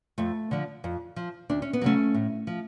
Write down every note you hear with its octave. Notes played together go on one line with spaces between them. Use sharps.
F2 A3
D3 F3
F2
F3
D2 D4
C#4
B3
C#3 F#3 A3 C#4
A2
F3